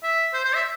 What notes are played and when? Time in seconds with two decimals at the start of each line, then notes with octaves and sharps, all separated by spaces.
0.03 E5
0.33 C5
0.44 C5
0.54 E5